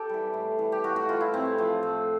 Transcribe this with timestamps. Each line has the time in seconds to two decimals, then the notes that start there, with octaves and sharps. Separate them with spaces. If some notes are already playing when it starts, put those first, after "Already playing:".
Already playing: G4 A4
0.09 E3 G3
0.34 A2
0.59 E3 G3
0.72 G4
0.84 A2 F#4
0.96 F#4
1.09 E3 G3 F4
1.21 E4
1.34 A2 C4
1.58 F3 A3
1.83 A2